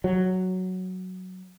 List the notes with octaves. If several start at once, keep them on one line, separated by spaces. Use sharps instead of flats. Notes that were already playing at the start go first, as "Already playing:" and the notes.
F#3